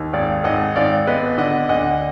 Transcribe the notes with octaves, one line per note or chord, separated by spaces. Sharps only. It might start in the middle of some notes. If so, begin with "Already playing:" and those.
Already playing: D#2
G#1 D5 F5
G#1 D#5 F#5
G#1 D5 F5
B3 B4 D#5
D3 D#5 F#5
D2 D#5 F#5